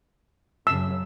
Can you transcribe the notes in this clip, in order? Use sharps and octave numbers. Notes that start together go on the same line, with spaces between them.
F#2 C#3 F#3 E6